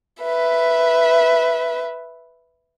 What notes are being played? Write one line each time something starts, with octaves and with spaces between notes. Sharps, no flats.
B4 E5